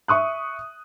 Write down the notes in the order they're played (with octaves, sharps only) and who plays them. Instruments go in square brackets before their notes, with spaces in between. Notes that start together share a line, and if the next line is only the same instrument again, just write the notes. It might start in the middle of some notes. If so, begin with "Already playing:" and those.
[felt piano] E5 C#6 D#6 F#6